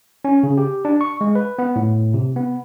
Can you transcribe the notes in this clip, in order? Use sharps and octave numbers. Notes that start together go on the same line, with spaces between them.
C#4
C#3
G4
D4
C#6
G#3
B4
B3
A2
C3
B3